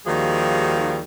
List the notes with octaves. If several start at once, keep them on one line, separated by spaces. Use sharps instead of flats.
D#2 D#3 F3 G3 F#4 G#4